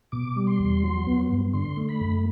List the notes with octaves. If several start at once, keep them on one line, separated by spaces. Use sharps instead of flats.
B2 D6
G3
C6
E2
F#3
B3
G2
D3 C6
A3
B5
F#2